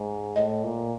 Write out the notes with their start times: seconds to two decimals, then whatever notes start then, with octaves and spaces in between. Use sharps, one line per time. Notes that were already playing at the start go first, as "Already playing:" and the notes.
Already playing: G#2
0.36 A2 D#5
0.64 A#2